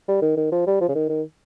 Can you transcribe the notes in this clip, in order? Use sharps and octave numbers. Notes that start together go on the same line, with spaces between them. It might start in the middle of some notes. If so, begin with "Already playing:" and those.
G3
D#3
D#3
F3
G3
F3
C#3
D#3
D#3